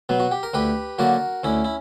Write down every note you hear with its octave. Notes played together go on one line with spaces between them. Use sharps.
B2 F#3 B3
F#4
G4
A#4
D2 G4 B4
D3 F#3 A#3 F#4 A#4
D2 C#4 E4
E4